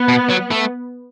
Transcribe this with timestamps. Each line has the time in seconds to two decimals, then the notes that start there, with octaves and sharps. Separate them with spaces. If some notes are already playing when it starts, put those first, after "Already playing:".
Already playing: B3
0.08 B2
0.30 F#3
0.51 A3